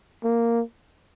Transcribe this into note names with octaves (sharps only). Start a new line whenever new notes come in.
A#3